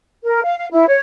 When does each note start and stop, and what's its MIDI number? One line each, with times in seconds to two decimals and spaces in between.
0.24 0.41 70
0.43 0.54 77
0.57 0.67 77
0.72 0.88 64
0.88 1.00 73